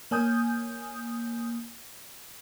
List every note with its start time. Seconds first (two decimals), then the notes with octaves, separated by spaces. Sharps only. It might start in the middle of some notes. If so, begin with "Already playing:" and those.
0.11 A#3 C#5 G#5 D#6 G6